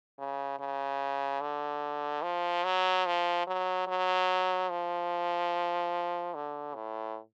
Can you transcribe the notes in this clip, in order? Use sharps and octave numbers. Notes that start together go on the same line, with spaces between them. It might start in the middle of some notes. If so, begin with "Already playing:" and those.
C#3
C#3
D3
F3
F#3
F3
F#3
F#3
F3
D3
A2